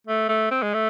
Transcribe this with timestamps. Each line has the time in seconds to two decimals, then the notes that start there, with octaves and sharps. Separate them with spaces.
0.07 A3
0.29 A3
0.51 C4
0.63 G#3
0.74 A3